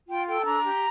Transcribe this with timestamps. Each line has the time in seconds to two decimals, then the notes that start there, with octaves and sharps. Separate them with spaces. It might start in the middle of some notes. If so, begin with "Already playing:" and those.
0.07 F4 G5
0.26 A4 G5
0.39 A5
0.45 D4 A#5
0.64 G4